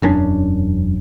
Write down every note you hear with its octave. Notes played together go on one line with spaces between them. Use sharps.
E1 F#2 C#4 D4